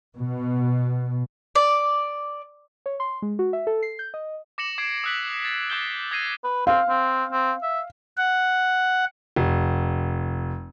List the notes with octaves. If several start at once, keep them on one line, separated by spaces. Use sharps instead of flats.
B2
D5
C#5
C6
G#3
F#4
E5
A4
C7
G6
D#5
D6 A#6 C#7 E7 F#7
D6 G#6 C7 D7
D#6 E6 F#6 B6 F#7
A6
D6 F#6 G6 C7 G7
D#6 G#6 A#6 C7 D#7
B4
C4 F5
C4
C4
E5
F#5
F1